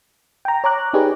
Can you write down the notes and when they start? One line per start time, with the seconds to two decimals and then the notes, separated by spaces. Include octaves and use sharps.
0.45 G5 A#5
0.64 C#5 A#5 D6 F#6
0.93 D#4 G4 G#4 B4 C#5 D5